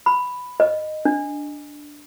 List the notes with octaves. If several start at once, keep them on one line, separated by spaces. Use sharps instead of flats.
B5
D#5
D4